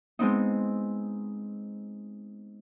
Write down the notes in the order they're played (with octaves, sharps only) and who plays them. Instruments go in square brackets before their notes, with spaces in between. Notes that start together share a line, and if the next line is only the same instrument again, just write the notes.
[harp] G#3 B3 C4 D#4